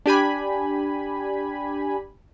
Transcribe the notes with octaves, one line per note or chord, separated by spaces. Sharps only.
D4 G4 G#5 B5